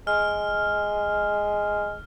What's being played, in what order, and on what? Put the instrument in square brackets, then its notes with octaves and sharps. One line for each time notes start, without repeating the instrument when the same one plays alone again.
[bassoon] G#3 [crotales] F6